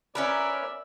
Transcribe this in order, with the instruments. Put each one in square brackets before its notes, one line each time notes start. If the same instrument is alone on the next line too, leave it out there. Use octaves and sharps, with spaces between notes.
[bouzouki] C#4 A#4 B4 [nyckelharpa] D5 E5